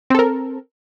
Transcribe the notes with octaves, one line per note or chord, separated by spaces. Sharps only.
C4 A4 A#4